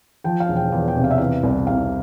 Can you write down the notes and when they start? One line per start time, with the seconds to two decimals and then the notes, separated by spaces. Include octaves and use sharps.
0.24 F3 G5
0.40 F5
0.49 E1
0.56 G5
0.72 E2 F5
0.88 G5
0.96 C3
1.04 F5
1.11 E5
1.18 E3 F5
1.43 C2
1.67 C3 F5